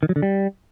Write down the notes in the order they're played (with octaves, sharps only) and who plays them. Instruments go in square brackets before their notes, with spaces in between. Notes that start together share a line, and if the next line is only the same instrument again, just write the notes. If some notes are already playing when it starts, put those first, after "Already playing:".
[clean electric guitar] D#3
F#3
D3
G3